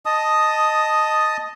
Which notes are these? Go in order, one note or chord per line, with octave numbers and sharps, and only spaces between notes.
D#5 A5 D#6